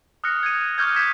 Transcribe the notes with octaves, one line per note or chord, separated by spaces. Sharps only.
D#6 F6 F#6 A#6 C#7
G#6 D#7
C#6 D6 F6 G6 G#6 A#6
F6 G#6 B6 E7